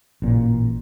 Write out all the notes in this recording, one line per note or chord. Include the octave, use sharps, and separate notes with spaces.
A1 A#2